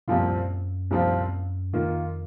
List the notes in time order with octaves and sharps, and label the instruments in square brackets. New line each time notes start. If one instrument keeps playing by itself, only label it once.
[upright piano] C2 A#2 F3 C4 F4 [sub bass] F#2
[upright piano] C2 A#2 F3 C4 F4
[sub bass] F2 [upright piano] D#3 A#3 F4